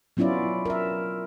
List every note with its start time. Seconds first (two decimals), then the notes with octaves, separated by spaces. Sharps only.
0.17 F#3 B3 C#4 E4 F4 D5
0.66 A#4 E5